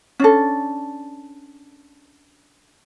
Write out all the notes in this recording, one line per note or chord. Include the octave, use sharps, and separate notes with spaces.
C#4 D4 A4